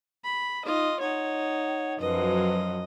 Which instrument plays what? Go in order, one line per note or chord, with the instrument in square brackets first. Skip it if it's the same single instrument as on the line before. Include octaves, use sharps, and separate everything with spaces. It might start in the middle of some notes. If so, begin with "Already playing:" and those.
[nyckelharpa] B5
[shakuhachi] D#4 [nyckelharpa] F4 D#5
[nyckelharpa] D#4 C#5 [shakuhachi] F#5
[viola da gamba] F#2 F3 F#3 [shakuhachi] B4 [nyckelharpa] D#5